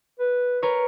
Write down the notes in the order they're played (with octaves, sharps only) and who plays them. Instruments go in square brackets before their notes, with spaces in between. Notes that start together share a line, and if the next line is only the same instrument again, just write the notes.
[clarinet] B4
[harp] A#4 B4 C#5